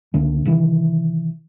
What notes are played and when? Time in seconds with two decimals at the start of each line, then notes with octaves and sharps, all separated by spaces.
0.14 C#2 D3 A#3
0.45 C3 D#3 E3